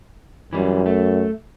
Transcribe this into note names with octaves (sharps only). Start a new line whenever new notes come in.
F#2 E3 G3
A3